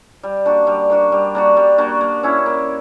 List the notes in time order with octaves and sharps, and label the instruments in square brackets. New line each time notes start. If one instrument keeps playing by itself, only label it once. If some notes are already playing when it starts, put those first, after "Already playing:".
[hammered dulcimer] G3
A#3 D4 F#4
G3
A#3 D4 F#4
G3
A#3 D4 F#4
G3
A#3 D4 F#4
A#3
C#4 E4
A#3